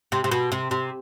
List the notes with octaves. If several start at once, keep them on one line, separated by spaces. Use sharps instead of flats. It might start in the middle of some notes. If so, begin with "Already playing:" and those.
C3
C3
B2
C3
C3